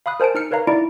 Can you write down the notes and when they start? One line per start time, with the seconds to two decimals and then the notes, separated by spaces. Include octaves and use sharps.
0.06 F5 B5 D#6 F#6
0.20 A#4 C5 G#5 A5 D7
0.35 D#4 F6 C#7
0.51 A#4 B4 C#5 F5 A#5
0.67 D#4 E4 D5 A#5 D7